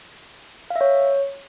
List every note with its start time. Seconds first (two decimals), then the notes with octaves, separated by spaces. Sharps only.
0.70 F5
0.76 E5
0.81 C#5